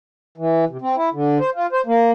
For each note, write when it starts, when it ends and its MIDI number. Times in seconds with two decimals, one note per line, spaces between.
0.38 0.65 52
0.69 0.77 48
0.82 0.96 60
0.96 1.09 64
1.14 1.38 50
1.40 1.50 72
1.55 1.66 65
1.72 1.81 72
1.86 2.11 58